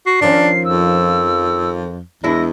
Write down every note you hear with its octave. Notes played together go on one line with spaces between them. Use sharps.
F#4 C7
D#3 F3 C#4 D4
F2 E6
E2 G#3 D4 E4 A#6